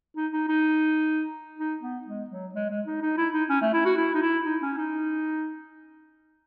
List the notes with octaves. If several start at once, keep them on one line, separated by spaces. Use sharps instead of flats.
D#4
D#4
D#4
D#4
B3
G#3
F#3
G#3
G#3
D#4
D#4
E4
D#4
C#4
A3
E4
F#4
E4
D#4
E4
D#4
C#4
D#4